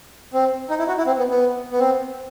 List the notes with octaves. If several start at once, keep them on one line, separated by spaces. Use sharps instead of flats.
C4
D#4
E4
F#4
E4
C4
B3
B3
B3
C4